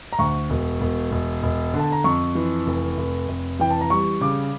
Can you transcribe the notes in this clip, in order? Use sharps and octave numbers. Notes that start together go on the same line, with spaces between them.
A#5
D2 C#6
E1
E1
E1
E1
D3
A5
A#5
F2 C#6
E3
F1
F1
F1
E3 G5
A5
A#5
G3 C#6
C#3 D6